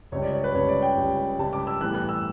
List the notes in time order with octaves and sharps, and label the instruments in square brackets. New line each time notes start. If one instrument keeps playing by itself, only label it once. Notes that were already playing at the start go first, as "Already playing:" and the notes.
[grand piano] C#2 C#3 G3 C#5
D5
C#5
B4
C#2 C#3 G3 C#5
D5
G5
C#2 C#3 G3
C#2 C#3 G3 A5
D6
E6
A2 E3 G3 B3 F#6
F#6
E6